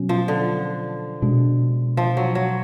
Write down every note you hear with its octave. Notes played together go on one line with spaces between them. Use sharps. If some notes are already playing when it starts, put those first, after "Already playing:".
Already playing: B2 F#3 C#4
F3
D3
B2 G#3 D4
F3
F#3
F#3